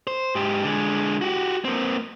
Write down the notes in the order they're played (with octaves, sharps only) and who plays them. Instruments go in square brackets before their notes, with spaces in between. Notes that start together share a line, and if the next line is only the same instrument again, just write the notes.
[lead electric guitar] C5
G#2 G4
D3 G#3
F#4 G4
A#3 C4